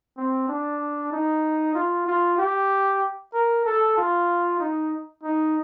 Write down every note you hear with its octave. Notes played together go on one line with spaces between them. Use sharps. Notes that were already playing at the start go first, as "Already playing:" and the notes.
C4
D4
D#4
F4
F4
G4
A#4
A4
F4
D#4
D#4